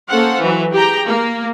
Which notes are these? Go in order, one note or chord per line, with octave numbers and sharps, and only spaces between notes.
A#3 C#4 A4 C5 F5 F#5
E3 F#3
G4 G#4 G5 A#5
A#3